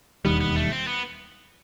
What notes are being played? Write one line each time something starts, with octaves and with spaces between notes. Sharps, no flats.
E1 D#2 D#3 G3 B3
B3
A3
C4
B3